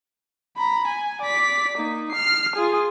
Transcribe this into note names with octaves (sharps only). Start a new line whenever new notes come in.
A#5 B5
G#5
D5 B6
A#3 D#4
F6 C7
F4 G#4